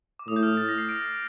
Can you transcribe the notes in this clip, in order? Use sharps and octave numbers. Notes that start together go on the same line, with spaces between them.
D6
A2 D#6
G6
F6
A6
A#6
C7
D7